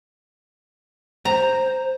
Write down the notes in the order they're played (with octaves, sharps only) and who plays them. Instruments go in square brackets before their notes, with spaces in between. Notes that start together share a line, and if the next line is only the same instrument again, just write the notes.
[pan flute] C5 [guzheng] A#5